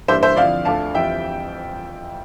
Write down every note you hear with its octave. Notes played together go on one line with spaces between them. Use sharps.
G2 E3 G3 A#3 D4 C5 E5
C5 E5
D3 F3 C4 E4 D5 F5
D2 D3 A3 D4 F4 F5 A5
F2 E3 G3 C4 F4 E5 G5